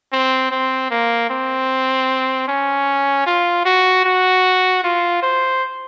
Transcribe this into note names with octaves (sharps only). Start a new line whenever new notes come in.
C4
C4
A#3
C4
C#4
F4
F#4
F#4
F4
C5